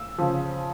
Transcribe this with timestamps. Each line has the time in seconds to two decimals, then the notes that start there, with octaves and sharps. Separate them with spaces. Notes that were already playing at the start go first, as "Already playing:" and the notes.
Already playing: E6
0.18 C#3 F3